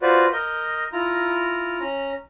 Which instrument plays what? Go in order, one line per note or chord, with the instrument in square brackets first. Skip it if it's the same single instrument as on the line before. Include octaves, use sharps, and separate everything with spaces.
[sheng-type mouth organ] F4 F#4 B4 C5 D5
A#4 D#5 G6
E4 F4 A#5
C#4 A#5